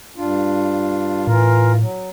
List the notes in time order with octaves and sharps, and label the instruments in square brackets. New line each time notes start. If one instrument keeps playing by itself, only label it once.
[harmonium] G2 D4 F4
[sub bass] A2 [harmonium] E3 F4 A#4
[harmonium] F#3